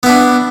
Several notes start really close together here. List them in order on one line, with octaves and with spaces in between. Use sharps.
B3 E4 D4